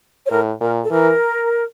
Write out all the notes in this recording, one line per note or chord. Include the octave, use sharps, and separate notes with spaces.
C#5
A2 A#4
A#2 A#4
A4
E3 A#4